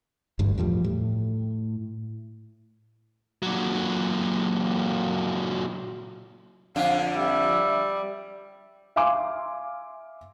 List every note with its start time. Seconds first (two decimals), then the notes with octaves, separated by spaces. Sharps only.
0.39 A1 D2 G2
0.58 E2 A2 F3 G3
0.84 A2
3.42 A#2 F#3
6.76 F2 D3 D4 F5
7.16 G3 E5
8.96 E5 F5 G#5 C6 D6